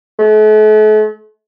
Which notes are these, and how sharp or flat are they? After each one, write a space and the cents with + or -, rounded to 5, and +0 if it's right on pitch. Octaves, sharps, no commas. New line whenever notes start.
A3 -45